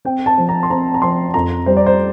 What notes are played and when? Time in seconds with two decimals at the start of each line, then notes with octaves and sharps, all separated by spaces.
0.05 C4 G5
0.26 A5
0.38 F3
0.49 A#5
0.63 C6
0.70 C4 A#5
0.94 A#5
1.02 F3 C6
1.34 F2 A#5
1.66 G3 C5
1.77 D5
1.86 C5